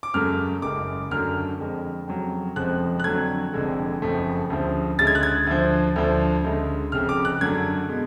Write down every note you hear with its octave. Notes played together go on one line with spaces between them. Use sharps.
D6
F#2 C#3 F#3 A3 F6
F#1 F#2 C#3 G#3 D6
F#2 D3 F#3 A3 F6
F2 D3 G#3
F2 C#3 F#3
F1 F2 C#3 F3 G#3 F#6
F#6
F2 D3 F#3 A3 G#6
F1 F2 D3 G#3
F#1 F2 C#3 F3 A3
D2 C#3 F3
D2 C#3 G#3 A6
G#6
F#6
G#6
D2 D3 F3
D2 D3 F3
D2 C#3 G#3
F1 F2 C#3 F6
D6
F#6
F#2 D3 F#3 A3 G#6
B2 G#3